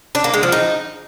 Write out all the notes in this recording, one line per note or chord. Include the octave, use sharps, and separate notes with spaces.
D4
A#3
G#3
F3
D#4